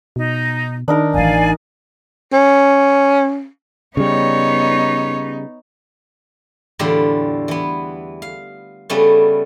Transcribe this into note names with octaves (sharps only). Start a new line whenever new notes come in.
B2 D#4
D#3 D4 D#4 A#4
A1 E3 D5 F5 G#5
C#4
C#3 G3 B3 D#4 C#5
E2 A2 D3 G3 F4 G4
E3 B3
F5
C#3 G3 A3 B3 C#4